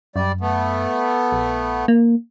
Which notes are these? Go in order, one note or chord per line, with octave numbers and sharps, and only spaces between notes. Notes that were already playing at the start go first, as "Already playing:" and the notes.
F#2 G3 D5
A3 B3
A#1
A#3